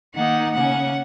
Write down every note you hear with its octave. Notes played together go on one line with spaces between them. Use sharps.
D#3 A#3 D#4 F#5
C#3 A#3 C#4 F#5